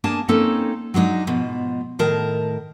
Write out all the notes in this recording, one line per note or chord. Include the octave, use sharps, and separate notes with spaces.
A#3 D4 G#4 G#5 A5
A#3 C4 C#4 D#4 A4 C#5
F#3 G#3 D4 D#4
G#2 B2 F3
A2 D#3 A#4 A5